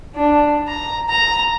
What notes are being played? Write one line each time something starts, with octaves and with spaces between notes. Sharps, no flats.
D4
A#5
A#5